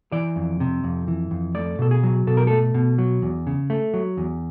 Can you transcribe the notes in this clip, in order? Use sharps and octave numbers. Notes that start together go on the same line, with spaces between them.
E3 D5
F2
C3
F2
E3
F2
A3 D5
B2 A4
G#4
F#3
B2 A4
A#4
A3 A4
B2
F#3
E2
C#3
A3
F#3
E2